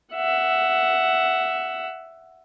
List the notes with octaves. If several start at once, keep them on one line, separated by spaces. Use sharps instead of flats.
E5 F#5